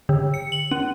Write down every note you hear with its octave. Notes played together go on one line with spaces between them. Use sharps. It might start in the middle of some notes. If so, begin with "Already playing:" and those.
D3
C#7
F#7
C#4